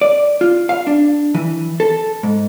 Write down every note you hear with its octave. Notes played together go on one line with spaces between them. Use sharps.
D5
F4
F5
D4
E3
A4
G#2